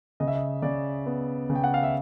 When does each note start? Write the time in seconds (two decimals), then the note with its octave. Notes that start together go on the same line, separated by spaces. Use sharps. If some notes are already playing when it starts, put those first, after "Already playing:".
0.20 C#3 D#5
0.28 E5
0.35 D#5
0.62 C#3 D5
1.06 B3
1.50 C#3
1.55 G5
1.64 F#5
1.74 F5
1.83 E5